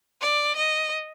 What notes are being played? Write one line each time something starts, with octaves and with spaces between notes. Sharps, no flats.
D5
D#5